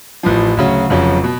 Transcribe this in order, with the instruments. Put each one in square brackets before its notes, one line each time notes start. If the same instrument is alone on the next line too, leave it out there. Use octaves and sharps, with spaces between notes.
[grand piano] A1 A2 F3
D2 C#3 F#3
F1 F2 C#3 F#3
B2